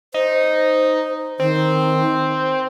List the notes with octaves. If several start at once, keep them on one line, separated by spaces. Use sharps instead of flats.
D#4 C5
D#3 C4